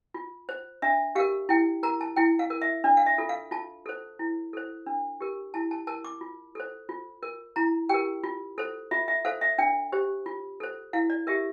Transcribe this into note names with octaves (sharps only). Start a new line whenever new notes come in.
F4
C5
D4 E5
G4 A#4 F5
E4 G5
A#4 A#5
A5
E4 G5
F5
A#4
E5
D4 D5
F5
E5
F4 A4
F5
F4 A5
A4 C5
E4
A4 C5
D4
G4 A#4
E4 A5
A5
A#4 A5
D6
F4
A4 C5
F4
A#4
E4 A#5
G4 A#4 G5
F4
A4 C5
F4 E5
E5
A4 C5 F5
E5
D4 G5
G4 C5
F4
A4 C5
E4 F5
D5
G4 A#4 E5